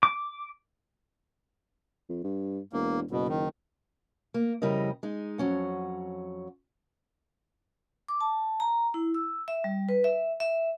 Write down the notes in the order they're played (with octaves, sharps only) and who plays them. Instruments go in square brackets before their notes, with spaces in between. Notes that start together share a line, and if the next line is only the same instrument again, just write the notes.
[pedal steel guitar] D6
[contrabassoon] F2
G2
[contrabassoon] E1 [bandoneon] A#3
[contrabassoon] F#1 [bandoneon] B2
[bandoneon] D#3
[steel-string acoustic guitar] A#3
F2 C#3 G3 E4 A#4 D#5
G#3 D#4
F2 F#3 C#4 F#5
[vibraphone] D6
A5
A#5
E4
E6
E5
G3
B4
E5
E5